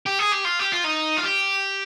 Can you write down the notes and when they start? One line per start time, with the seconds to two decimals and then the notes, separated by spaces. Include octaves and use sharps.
0.06 G4
0.19 G#4
0.32 G4
0.45 F4
0.59 G4
0.72 F4
0.84 D#4
1.18 F4
1.24 G4